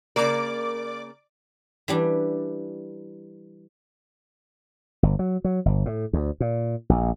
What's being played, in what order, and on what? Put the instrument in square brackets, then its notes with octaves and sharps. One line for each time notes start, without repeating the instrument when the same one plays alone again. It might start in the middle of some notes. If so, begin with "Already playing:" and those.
[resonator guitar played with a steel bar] C#3 A#3 A#4 [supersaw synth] D5 D6
[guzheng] E3 G3 D4
[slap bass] G1
F#3
F#3
G1
A2
D2
A#2
A#1